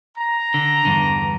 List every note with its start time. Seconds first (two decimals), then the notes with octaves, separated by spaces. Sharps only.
0.17 A#5
0.54 D3
0.85 E2 G2 D3